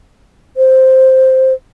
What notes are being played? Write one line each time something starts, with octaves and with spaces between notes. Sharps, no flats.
C5